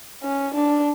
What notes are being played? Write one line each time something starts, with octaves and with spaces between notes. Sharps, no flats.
C#4
D4